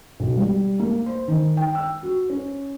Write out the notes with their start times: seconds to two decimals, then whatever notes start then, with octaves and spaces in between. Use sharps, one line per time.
0.20 B1
0.37 G3
0.80 A#3
1.06 C5
1.28 D#3
1.57 G5
1.75 E6
2.03 F#4
2.30 C#4